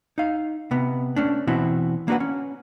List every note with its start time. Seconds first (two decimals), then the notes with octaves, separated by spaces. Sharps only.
0.18 D#4 F5
0.71 C3 B3
1.16 A3 C#4 D4
1.47 B2 E3 C4 E4 F#4
2.08 A#3 D4 F#4 B4 F#5
2.20 C#4